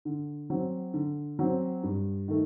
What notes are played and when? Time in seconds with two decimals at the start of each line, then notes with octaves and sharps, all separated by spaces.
0.05 D3
0.50 F#3 C4
0.94 D3
1.39 F#3 C4
1.83 G2
2.28 D#3 A3